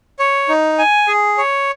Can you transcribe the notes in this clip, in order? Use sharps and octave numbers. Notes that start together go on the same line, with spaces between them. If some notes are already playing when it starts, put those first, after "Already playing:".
C#5
D#4
G#5
G#4
C#5